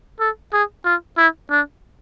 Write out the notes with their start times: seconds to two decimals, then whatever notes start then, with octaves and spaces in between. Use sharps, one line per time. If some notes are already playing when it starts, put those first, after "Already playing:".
0.20 A4
0.53 G#4
0.85 F4
1.17 E4
1.50 D4